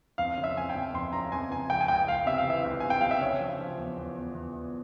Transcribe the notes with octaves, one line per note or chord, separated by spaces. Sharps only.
F2 F5
C#3
E5
F2 G#5
G5
F2
F2 C6
C#3 A#5
F2 G#5
F2 G#5
C#2 G5
G#5
C#2 G5
C#2 F5
C3 E5
F5
E3 E5
C#2
C3 G#5
G5
C3 F5
E5
C#3 C#5
F3
F3
E2
E2
E2
E2
E2